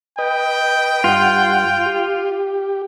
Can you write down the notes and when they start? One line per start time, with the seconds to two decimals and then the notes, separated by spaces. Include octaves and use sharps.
0.19 B4 D#5 G5
1.04 G2 F4 F#5
1.86 G4